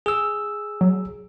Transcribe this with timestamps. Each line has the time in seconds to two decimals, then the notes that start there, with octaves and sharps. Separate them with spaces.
0.06 G#4 E6
0.81 F#3